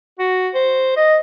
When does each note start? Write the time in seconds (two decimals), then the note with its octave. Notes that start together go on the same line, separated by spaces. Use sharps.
0.19 F#4
0.54 C5
0.97 D#5